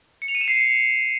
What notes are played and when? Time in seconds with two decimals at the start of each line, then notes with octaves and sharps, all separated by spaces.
0.22 C#7
0.28 F7
0.35 D#7
0.41 E7
0.48 C7